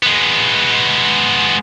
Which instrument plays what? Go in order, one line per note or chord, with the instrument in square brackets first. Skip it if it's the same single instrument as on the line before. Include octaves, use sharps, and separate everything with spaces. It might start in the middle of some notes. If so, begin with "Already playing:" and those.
[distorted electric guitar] G#3 B3